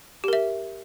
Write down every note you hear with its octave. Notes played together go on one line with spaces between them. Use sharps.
G4 A#4 E5